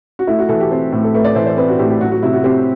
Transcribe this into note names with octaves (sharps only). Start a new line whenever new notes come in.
F#4
A3 E4
F#4
E3 A4
G4
C4 A4
A2
A4
A3 B4
D5
E3 C5
C5
C4 B4
F#4
A2 G4
G4
F#3 F#4
F#4
C3 E4
F#4
C4 G4